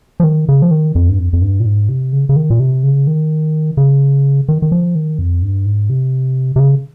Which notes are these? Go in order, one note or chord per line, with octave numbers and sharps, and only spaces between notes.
F3
D#3
C#3
F3
D#3
F2
G2
F2
F2
G2
A#2
G#2
C3
C#3
C#3
D#3
A#2
C3
C#3
D#3
C#3
D#3
D#3
F3
D#3
F2
G2
G#2
C3
C3
C#3